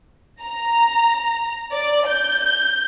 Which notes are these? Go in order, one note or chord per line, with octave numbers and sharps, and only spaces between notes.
A#5
D5
G6